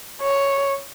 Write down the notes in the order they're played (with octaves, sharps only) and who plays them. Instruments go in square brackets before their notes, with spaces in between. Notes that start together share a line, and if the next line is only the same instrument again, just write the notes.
[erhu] C#5